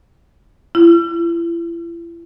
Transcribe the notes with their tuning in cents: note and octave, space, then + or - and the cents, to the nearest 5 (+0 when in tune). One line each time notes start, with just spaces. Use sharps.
E4 +40